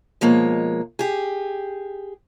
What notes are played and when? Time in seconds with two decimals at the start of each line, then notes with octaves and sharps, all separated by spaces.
0.21 B2 F3 G#3 A#3 C#5
0.99 G4 G#4